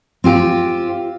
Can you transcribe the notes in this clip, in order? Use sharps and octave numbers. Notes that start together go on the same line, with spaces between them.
C4 F4 G4